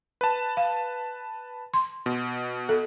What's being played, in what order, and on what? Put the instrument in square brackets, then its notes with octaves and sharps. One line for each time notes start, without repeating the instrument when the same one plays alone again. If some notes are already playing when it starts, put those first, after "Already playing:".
[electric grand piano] B4 A5
[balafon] F5
C6
[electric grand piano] B2
[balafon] A4